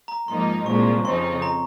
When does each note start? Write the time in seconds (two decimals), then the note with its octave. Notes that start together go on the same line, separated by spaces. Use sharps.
0.08 A#5
0.28 G#2 F3 A#3 D#4 C6
0.66 C2 A#2 F3 G#3 C#6
1.05 F2 C#3 F3 C4 D#4 C6
1.42 A#5